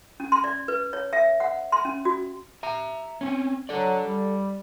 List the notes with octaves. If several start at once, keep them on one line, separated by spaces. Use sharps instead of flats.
C#4
C6
D5
B4
C#5
E5
F#5
C6
C#4
F#4
E5 A#5
C4 C#4
F#3 A4 D5
G3